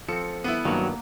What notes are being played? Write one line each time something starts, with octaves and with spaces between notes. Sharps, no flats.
F3 C4 A4 C#7
B3 E4
G2 D#3 F#3 A#3 C#5 F#5